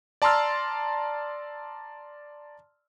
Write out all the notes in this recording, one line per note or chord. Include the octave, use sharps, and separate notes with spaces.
D5 A5 A#5 C6 E6 F6